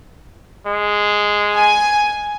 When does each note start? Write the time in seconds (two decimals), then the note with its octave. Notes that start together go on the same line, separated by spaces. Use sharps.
0.67 G#3
1.55 G#5